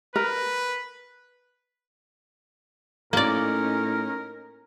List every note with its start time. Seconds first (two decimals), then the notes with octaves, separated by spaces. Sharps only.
0.16 A#4 B4
3.13 A2 A#3 C#4 D#4 A#4 D5